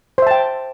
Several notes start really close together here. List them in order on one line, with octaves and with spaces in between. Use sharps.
C5 E5 A5 G5